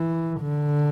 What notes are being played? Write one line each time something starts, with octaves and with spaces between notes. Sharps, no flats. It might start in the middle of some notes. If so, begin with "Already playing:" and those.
Already playing: E3
D3